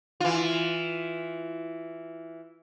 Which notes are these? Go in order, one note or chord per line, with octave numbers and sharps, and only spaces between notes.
E3 F4